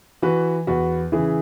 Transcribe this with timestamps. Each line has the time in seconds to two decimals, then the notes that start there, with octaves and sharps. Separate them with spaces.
0.22 E3 F#4 B4
0.67 E2 F#4 B4
1.12 C#3 E3 E4 G#4